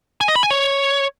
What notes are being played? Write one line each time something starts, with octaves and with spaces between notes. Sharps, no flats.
G#5
D#5
B5
G#5
C#5